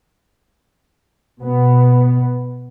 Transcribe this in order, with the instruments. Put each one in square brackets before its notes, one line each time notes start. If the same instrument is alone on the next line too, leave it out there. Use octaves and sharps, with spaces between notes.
[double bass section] B2 B3